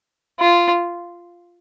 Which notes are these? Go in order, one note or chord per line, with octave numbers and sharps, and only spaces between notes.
F4